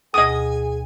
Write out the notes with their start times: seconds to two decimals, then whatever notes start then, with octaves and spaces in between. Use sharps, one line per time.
0.14 D2 B2 G#4 D#5 G#5 D#6